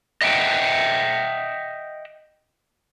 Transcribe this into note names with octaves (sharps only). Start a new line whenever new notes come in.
D#5 E5 F#5 G5